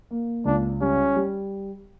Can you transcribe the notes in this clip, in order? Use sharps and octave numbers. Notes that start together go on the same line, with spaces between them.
A#3
C#2 D4
G3 C#4
G3